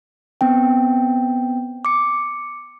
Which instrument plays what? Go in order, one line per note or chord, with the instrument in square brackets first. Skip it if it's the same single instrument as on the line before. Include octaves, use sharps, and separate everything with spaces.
[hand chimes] B3 C4 G5
D6 C#7